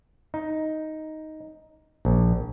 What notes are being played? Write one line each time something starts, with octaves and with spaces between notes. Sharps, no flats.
D#4
A#1